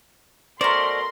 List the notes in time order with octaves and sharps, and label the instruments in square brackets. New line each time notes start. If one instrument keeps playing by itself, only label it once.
[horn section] B2 A3 A#4 [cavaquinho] C5 C#6 [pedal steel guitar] D5 [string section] C6